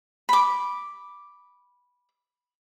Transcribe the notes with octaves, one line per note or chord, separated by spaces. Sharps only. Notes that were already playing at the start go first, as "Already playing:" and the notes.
B5 D6